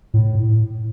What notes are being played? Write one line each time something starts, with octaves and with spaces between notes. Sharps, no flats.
A2